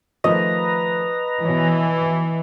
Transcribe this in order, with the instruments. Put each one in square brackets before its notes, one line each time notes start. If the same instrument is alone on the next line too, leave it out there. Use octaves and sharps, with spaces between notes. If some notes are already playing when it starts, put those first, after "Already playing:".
[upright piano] D#3 F3 A3 [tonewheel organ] B4 A#5 [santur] D#5
[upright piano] B2 C#5 [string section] E3